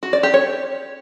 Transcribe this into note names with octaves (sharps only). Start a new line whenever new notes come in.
F#4
D5
G4
C#5